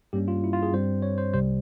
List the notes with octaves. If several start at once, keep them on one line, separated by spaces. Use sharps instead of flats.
G2 G3 A#3 C#4 G4
F4
E4
F4
G#4
G2 G3 C4 C5
C#5
C5
C2 C3 G3 C5